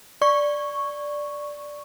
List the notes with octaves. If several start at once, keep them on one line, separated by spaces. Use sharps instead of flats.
D5 C#6